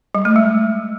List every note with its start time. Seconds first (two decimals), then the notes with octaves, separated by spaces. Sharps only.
0.15 G3
0.25 A3
0.36 G#3